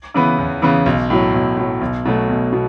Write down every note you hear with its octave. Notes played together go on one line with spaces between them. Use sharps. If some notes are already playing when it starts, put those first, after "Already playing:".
C#3 E3 B3
E2
C#3 E3 B3
B1
A2 F#3
B1
A2 F#3
B1
B2 F#3 A3
B1
B2